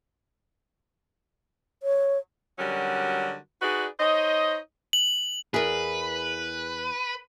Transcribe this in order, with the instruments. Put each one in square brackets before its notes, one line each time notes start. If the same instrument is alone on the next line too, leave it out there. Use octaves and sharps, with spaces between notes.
[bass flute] C#5
[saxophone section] D3 F#3 G3 C#4 F#4 A#4
D#4 F#4 G#4 B4 D5
D#4 C5 C#5 D#5
[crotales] F#7
[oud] E2 A#4 [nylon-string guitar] G#4 [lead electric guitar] B4